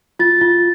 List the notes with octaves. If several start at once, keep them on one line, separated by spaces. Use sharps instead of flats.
F4 A6
F4